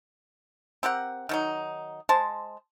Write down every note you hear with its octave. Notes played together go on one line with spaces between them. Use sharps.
C4 G4 A#4 F#5
D#3 F#3 D#4
G#3 C5 A5